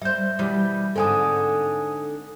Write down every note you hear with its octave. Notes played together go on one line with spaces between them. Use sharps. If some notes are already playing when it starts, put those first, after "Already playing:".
G3 C5 E5 G6
B2 E3 G3
G#2 D3 C4 A4 G#5 D#6